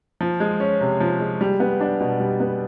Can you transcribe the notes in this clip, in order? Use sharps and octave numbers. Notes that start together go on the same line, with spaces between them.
F3
G#3
C#4
C3
F3
G#3
G3
B3
D4
B2
G3
B3